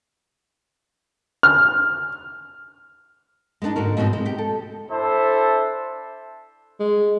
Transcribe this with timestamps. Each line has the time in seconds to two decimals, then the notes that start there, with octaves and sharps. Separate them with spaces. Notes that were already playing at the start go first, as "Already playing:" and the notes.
1.43 F6
3.62 G#3 B3 C4 D4 D#4
3.76 G#2 D3 F#4 A#4
3.97 G#2 B2 F3 A3 B3 C4
4.13 G#3
4.26 G4 G5
4.38 A4
4.90 D4 E4 A4 C5 E5 A5
6.80 G#3